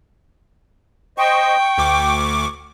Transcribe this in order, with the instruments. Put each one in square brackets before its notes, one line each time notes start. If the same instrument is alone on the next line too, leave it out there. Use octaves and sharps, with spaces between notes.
[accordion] C5 D#5 C#6 [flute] G5
[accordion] C#6
[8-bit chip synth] D2 D6